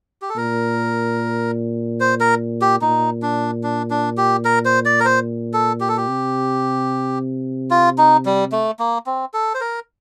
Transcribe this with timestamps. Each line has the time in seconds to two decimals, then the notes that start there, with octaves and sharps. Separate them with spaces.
0.22 G4
0.29 A4
0.37 A#2 A#4
2.00 C5
2.20 A#4
2.62 G4
2.81 A#2 D#4
3.22 D4
3.63 D4
3.90 D4
4.18 G4
4.45 A#4
4.65 C5
4.85 D5
5.00 A#4
5.05 C5
5.54 A4
5.80 G4
5.89 A4
5.97 G4
6.08 C3
7.71 F4
7.98 D#4
8.26 G3
8.52 A3
8.79 A#3
9.06 C4
9.34 A4
9.55 C5
9.61 A#4